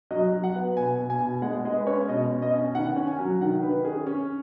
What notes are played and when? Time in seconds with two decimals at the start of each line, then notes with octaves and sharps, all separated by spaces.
0.11 F#3 D#5
0.32 F#3
0.44 F#5
0.54 B3
0.76 B2 G#5
0.98 B2
1.10 G#5
1.20 B2
1.42 G#3 F#5
1.65 G#3 D#5
1.78 B4
1.86 C#4 C#5
2.08 B2 D#5
2.31 B2
2.42 D#5
2.53 C#4
2.74 D#3 F#5
2.96 C#4
3.07 G#5
3.19 F#3
3.41 D#3 F#5
3.63 D#3 B4
3.85 C#4 G#4
4.07 C#4